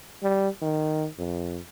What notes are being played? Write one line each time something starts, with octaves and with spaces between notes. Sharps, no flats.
G3
D#3
F2